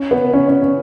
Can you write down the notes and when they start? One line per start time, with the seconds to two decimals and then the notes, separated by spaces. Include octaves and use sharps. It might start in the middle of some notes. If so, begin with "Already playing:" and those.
Already playing: C#4
0.11 B3
0.33 C#4
0.48 C#4
0.62 C#4